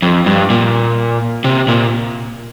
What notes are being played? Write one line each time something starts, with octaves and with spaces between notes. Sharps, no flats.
F2
G2
A#2
C3
A#2